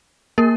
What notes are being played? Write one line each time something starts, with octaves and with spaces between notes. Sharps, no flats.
A#3 A#4